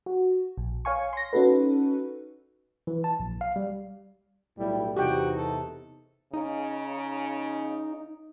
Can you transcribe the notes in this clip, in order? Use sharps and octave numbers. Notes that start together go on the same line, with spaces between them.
F#4
A#1
C#5 F5 G#5 C#6
C6 A#6
C#4 D#4 F#4 A4 B4
E3
A5
A#1
F5
G3
B1 A2 G3 E4
E2 C3 D#4 F#4 G4 G5
A4
C#3 D#4